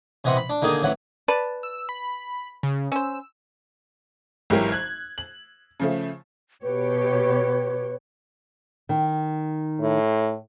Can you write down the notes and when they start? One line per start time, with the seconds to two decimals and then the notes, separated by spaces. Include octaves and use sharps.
0.24 C3 E3 D#5 F#5 C6
0.37 B5
0.49 D4
0.62 D3 D#3 A#3 D#4 G#4
0.83 A1 E3 F#3 F#5
1.28 B4 D5 A5
1.63 E6
1.89 B5
2.63 C#3
2.92 C#4 C5 E6
4.50 G#1 E3 F#3 G4 A#4
4.72 F#6 G#6
5.18 F#7
5.80 C#3 F3 A3
6.63 B2 G4 B4 C#5
8.89 D#3
9.81 A2